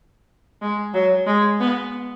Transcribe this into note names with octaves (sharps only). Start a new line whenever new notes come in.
G#3
F#3
G#3
B3